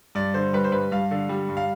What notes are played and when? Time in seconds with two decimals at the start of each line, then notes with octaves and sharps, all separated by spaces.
0.15 G2 D5
0.34 D3 C5
0.53 G3 B4
0.64 C5
0.72 G2 B4
0.92 G2 F5
1.11 D3
1.29 G3
1.49 G2
1.57 F5